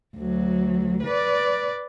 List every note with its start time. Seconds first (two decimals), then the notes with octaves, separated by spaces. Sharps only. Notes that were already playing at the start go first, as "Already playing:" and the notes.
0.16 D2 F#3
1.03 B4 D5